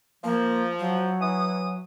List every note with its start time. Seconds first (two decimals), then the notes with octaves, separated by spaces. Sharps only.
0.24 F3 A#3
0.79 F#3
1.21 E3 D#6